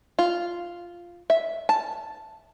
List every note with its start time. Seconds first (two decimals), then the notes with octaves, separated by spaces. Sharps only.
0.19 F4
1.30 E5
1.69 A5